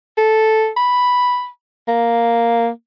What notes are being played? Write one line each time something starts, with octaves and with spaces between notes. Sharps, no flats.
A4
B5
A#3